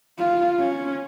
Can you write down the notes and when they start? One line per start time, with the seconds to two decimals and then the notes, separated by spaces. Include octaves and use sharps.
0.19 F4
0.59 C#4